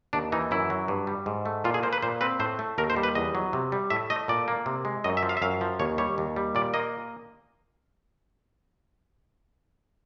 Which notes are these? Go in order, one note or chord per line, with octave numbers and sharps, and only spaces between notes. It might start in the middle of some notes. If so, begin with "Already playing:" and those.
D#2 D4
E3 D#4
F#2 E4
F#3
G2
G3
G#2
A3
A#2 F4
G#4
A#3 C5
B4
A#2 C5
C4 B4
A2 C5
A3
D#2 A#4
C5
G3
B4
E2 D#5
F#3
C3
G3
A2 E5
A3 D#5
A#2 D5
A#3
C3
G#3
F#2 D#5
E5
F3
F5
E5
F#2 F5
F3
D#2 C#5
G3 C#5
D#2
G3
A#2 D5
A#3 D#5